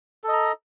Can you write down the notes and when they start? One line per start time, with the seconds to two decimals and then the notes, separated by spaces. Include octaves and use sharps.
0.24 A4
0.28 D#5
0.32 A#5